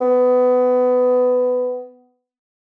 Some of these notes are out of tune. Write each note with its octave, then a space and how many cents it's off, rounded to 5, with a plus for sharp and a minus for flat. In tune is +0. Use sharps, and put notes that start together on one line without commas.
B3 +20